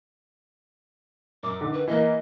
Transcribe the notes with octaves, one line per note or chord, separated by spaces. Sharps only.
F#2 D6
D3 D#3
B4
E3 A#3 A#4 D#5